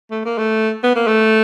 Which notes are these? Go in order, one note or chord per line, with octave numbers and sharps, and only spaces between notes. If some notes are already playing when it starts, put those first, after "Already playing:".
A3
A#3
A3
B3
A#3
A3